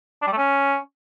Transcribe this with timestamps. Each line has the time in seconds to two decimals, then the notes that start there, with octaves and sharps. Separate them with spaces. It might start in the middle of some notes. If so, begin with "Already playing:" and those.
0.22 D4
0.27 G3
0.32 A3
0.37 C#4